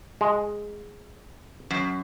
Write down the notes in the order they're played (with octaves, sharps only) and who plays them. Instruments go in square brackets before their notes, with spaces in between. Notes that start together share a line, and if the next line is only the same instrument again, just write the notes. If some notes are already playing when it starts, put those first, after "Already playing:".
[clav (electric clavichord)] G#3
[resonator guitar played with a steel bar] F#2